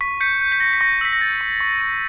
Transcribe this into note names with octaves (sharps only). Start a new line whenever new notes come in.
C#6 B6
G6 B6 C#7
G6
B6
G6 A#6
B6
C#6 A#6
E6 B6
A#6
G6 A6
C#6
C#6
C#6